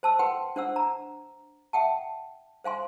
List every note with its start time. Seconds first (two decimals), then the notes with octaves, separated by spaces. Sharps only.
0.03 C5 A5 E6
0.19 B4 F#5 G5 C6
0.56 D4 C5 F#5 E6
0.76 A#5
1.73 E5 F#5 G5 A5
2.64 C5 F5 G#5 C6